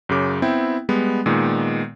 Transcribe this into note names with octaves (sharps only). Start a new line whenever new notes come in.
F#2 C#3 D6
B3 C4 E4 G5
G3 G#3 B3
A#2 D#3 G#3 B3